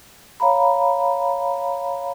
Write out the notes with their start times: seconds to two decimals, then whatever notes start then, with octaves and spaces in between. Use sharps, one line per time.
0.40 C#5 F5 A#5 B5